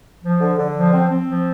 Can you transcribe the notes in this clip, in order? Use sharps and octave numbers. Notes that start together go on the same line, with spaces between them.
F3
D3
D3
F3
C4
C4
F3